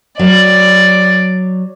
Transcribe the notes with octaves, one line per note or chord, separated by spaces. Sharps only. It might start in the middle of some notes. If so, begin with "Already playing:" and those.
F#3 D5